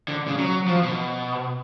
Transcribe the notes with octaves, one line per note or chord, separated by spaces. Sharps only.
D3
C#3
F#3
F3
B2